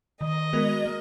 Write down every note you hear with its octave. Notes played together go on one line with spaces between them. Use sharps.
D#3 D#5
G#3 B3 F#4 A#4
A#3